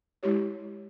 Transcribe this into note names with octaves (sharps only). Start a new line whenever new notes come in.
G#3 E4 G4 C#5